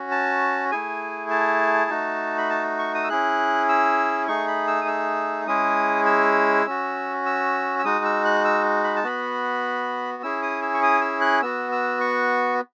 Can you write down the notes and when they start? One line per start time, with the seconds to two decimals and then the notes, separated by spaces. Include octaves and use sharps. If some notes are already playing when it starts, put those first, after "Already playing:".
Already playing: C#4 F#4
0.11 A5
0.71 A3 E4 G#4 G#5
1.30 A5
1.90 A3 D#4 F#4
2.38 B5
2.50 A5
2.79 C#6
2.95 D#6
3.04 E6
3.09 C#4 E4 G#4 F#6
3.69 E6
4.28 A3 D#4 G#4 C#6
4.48 B5
4.68 E6
4.81 D#6
4.88 E6
5.47 G#3 C#4 E4 G#4 D#6
6.06 E6
6.66 C#4 F#4
7.26 E6
7.79 E6
7.85 G#3 D#4 F#4 D#6
8.05 E6
8.25 F#6
8.45 E6
8.84 B5
8.96 A5
9.04 B3 F#4 B5
10.23 C#4 E4 G#4 E6
10.42 D#6
10.62 E6
10.74 C#6
10.83 D#6
11.01 E6
11.21 F#6
11.42 B3 F#4 E6
11.72 E6
12.01 C#6